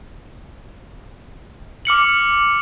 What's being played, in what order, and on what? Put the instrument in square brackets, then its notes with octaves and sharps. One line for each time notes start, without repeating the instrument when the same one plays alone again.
[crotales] D6 F6 C#7 F#7